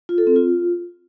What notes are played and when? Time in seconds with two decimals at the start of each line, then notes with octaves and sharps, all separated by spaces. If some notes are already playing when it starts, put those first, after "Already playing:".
0.09 F4
0.18 A4
0.27 C4
0.36 F4